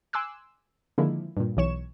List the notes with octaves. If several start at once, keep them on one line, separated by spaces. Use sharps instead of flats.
G#5 C6 D6 E6 F#6
D3 D#3 F3 G#3 A#3 E4
G2 A#2
B1 E3 C#5 C#6 E7